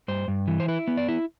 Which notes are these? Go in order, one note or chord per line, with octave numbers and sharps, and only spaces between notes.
G2 C5
G2
E3
C5
E4 B4
B3
D5
E4